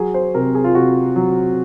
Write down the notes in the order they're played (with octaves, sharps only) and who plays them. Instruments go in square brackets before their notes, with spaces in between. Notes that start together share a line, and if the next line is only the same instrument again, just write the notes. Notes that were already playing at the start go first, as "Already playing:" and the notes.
Already playing: [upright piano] F#3 G#4
C5
C3 A#4
G#4
F4
C3 F#4
F#3